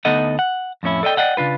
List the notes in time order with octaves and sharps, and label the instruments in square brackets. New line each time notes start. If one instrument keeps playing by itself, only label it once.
[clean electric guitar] D2 B3 D#4 A4 D#5 F#5
F#5
F2 A2 C#4 E4
A4 D5 D#5 G5
D5 D#5 F#5 G5
C#3 D4 F4 B4